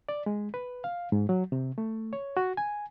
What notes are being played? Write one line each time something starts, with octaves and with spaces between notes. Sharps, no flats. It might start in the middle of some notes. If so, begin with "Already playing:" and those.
D5
G#3
B4
F5
G#2
F#3
C3
A3
C#5
F#4
G#5